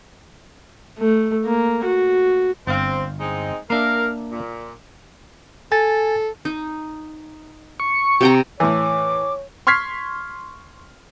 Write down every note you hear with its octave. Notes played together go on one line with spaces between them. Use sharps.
A3
A#3
F#4
G1 C4 F5
G#3 C4 D#4
A#3 D4 A#4 E5 F5
A#2
A4 G#5 A6
D#4
C#6
C3 G5 A#5
A2 E3 C#5 D6
C6 C#6 F6 G#6 B6 C7